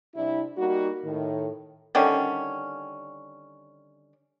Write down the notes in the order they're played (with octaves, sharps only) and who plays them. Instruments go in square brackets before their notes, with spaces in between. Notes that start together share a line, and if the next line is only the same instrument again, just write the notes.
[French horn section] C3 G3 D4 E4
G3 A#3 D#4 F#4
A2 D#3
[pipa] D3 D#3 G3 C#4